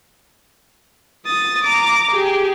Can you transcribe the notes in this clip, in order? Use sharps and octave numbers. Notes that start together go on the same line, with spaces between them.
D#6 A6
A#5 D6
G4 G#4